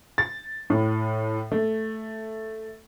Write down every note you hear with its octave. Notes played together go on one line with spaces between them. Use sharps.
A6
A2
A3